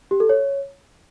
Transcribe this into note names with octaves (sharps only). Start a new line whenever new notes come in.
G4
A4
C#5